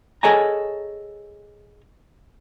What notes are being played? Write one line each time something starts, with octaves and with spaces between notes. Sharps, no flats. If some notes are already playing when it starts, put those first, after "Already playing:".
G#4 A4 C#5 D#5 G#5 A#5